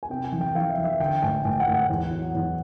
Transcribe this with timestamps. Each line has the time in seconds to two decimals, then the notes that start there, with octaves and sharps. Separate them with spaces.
0.03 G#5
0.10 C3 G5
0.25 G5
0.32 E3
0.41 G5
0.55 E3 F5
0.69 E5
0.78 E3
0.84 E5
0.99 D3 G5
1.22 A1 G#5
1.44 A1 G5
1.60 F#5
1.67 A1
1.74 F#5
1.90 E2
2.11 F#3
2.35 E2